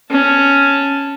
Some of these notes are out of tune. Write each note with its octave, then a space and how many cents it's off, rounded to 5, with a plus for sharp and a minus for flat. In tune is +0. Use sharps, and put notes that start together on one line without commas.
C#4 +0 A5 +0